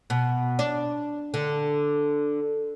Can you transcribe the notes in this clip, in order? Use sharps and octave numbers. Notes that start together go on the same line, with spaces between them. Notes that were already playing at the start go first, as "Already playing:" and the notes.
B2
D4
D3